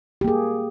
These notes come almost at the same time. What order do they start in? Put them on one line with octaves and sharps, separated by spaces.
G4 A#3 G#4